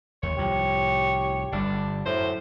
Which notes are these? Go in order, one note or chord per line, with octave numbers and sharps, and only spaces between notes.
D#2 C#5
C2 A2 F3 G4
G1 G3 D4
F#2 A2 C5